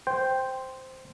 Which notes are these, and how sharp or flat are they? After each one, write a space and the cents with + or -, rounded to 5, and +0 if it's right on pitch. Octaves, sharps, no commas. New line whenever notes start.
C5 +0 G5 +0